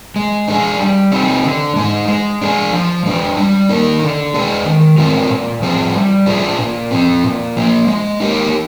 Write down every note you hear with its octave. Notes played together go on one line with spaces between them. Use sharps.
G#3
D4 G#4
G3
C4 D#4 G4
D3
G#3 D#4
G#3
D4 G#4
F3
G#3 D4
G3
A#3 D#4 A#4
D3
G#3 D4 G#4
D#3
G#3 C4 F4 A#4
A#2
F3 C4 F4 G#4
G3
D4 F4 G#4
A#2
F3 C4
A#2
F3 A#3
G#3
D#4 G4 A#4